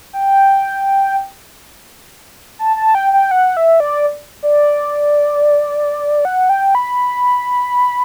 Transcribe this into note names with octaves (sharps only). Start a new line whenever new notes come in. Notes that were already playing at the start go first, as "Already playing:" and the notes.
G5
A5
A5
G5
G5
F#5
E5
D5
D5
F#5
G5
B5